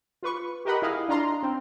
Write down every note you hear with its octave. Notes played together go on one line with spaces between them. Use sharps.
F4 B4 C#6
G4 A#4 D#5 F#5 B5
E4 G#4 D#5 F5
D4 F4 A#5 C6
C4